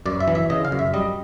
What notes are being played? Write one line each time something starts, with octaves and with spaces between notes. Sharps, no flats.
F#2 D5
E5
E3
E5
C#3 D#5
F5
F#2
E5
G3 D#5